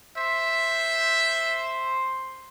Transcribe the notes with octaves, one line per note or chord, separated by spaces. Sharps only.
C5 E5